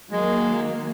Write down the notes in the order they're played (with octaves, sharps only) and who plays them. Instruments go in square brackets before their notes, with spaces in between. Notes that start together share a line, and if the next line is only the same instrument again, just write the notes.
[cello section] D#3 F#3 A#3 [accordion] G#3